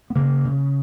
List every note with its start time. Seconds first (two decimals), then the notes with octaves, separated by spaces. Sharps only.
0.10 B3
0.15 C#3 A#3
0.45 C#3